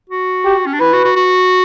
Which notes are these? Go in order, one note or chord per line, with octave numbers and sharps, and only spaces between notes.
F#4
G4
C#4
D4
E4 B4
F#4
F#4
F#4